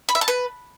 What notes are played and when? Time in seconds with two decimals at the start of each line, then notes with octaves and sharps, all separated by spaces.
0.09 B5
0.15 E5
0.21 A5
0.28 B4